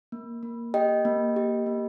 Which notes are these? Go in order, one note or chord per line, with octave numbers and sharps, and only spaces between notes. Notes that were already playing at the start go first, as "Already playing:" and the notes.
A#3
A#3
G4 D#5 G5
A#3
G4
A#3